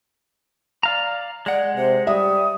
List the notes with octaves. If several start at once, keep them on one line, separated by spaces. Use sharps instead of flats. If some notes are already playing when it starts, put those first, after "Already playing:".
D5 F5 A#5
G#3 D5 F#5
C3 C5
G3 E5 D#6